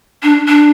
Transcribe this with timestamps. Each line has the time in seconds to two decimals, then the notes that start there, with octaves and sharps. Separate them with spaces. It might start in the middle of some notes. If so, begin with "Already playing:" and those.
0.23 D4
0.48 D4